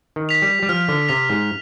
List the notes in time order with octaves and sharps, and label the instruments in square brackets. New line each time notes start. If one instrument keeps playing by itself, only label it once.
[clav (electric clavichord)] D#3
[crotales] B6 F7
[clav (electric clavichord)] G3
G3
[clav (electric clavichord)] F3 [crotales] F6
[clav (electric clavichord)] D3
[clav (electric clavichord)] C3 [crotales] B6 F7
[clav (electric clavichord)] G#2